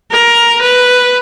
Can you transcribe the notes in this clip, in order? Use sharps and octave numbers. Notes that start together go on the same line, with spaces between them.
A#4
B4